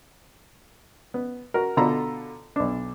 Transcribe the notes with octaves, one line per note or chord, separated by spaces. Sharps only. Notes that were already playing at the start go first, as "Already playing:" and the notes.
B3
F#4 A#4
B2 D3 F4 A4 A#5 B5
B1 D4